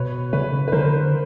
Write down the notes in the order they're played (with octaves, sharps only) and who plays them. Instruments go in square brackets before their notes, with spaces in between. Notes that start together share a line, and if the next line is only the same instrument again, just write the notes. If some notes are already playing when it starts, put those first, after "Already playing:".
Already playing: [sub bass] B2 [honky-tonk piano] B4 C#5
[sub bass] C#3 [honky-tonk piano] B4 C#5
[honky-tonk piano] B4
[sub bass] D3 [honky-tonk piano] A#4 C5